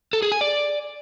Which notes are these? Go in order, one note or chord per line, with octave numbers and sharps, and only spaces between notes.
A4
G#4
G#5
D5